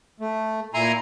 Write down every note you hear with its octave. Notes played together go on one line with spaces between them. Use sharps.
A3
A#2 E4 G#5 A#5 C6